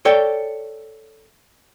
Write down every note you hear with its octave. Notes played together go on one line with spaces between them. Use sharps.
A4 C#5 D5 G5